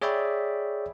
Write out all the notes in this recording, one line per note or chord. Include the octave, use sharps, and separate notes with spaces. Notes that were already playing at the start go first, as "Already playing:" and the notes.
G#4 C#5 D5 E5 G5 B5